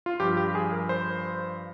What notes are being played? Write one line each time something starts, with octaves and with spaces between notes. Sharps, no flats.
F4
G2 F3 G4
G4
G#4
A#4
C5